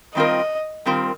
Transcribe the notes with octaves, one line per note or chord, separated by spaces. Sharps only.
D#3 G3 C4 F4 A#4 D#5
D#3 G3 C4 F4 A#4